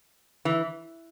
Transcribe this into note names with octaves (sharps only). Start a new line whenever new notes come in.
E3